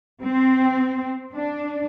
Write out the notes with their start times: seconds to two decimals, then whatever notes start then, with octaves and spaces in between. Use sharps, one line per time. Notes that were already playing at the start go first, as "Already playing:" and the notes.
0.23 C4
1.34 D4